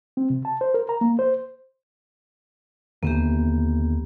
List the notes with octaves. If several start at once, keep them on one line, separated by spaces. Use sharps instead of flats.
C4
C3
A5
C5
A#4
A#5
A#3
C5
D#2 D3 E3 A#3 B3 G4